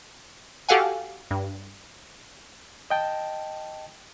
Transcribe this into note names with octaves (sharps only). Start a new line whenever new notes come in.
F#4 G4 A4 F5 F#5 G#5
G2
D#5 G5 A5